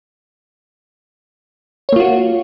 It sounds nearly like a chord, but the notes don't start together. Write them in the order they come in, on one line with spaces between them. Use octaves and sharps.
C#5 A#3 F4 F#4